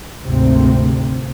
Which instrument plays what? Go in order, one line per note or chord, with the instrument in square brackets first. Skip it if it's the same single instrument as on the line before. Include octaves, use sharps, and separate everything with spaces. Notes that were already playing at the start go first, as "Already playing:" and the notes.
[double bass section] G#1 D2 C3 C4